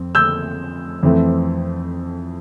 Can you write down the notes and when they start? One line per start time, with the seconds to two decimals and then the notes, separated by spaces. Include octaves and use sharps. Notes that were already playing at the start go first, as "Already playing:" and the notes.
Already playing: F2 C4
0.15 E6 G6
1.03 F2 E3 A3 C4